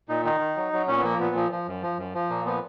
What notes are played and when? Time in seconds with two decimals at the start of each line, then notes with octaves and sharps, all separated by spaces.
0.09 A#2 D#4
0.25 D#3 D#4
0.40 D#3
0.56 F#3
0.73 F#3
0.87 A#2 C#4
0.97 B3
1.03 F3 A#3
1.20 A#2 B3
1.36 F3
1.52 F3
1.67 F#2
1.83 F3
1.98 F#2
2.14 F3
2.29 A#2 A#3
2.45 F3 B3